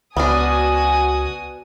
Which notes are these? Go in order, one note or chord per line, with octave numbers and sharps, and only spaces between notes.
C#2 B3 C#4 D4 F#4 G#5 D#6